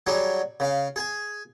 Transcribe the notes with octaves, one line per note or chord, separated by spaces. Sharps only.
F#3 G3 D4 G#4
C#3 F5
G#4 G#5